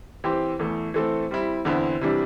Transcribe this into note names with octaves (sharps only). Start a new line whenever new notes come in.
E3 C4 G4 C5
E2 E3 A3
E3 A3 C4 A4
G3 C4 E4
E2 D3 C4 E4
C3 E3 G3 D4